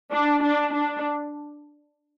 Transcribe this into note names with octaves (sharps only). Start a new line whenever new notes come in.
D4
D4
D4